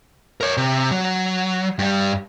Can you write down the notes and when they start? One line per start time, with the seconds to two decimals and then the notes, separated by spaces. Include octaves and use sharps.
0.41 A#4 C#5
0.57 C3
0.91 F#3
1.79 G2 G3